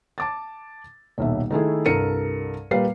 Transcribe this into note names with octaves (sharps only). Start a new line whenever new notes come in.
A5 D6 A6
D#1 B1 E5
D#3 A3 E4 G#4
C2 G2 A4 A#4 C#7 D#7
A#2 G3 A#4 B4 F5 C7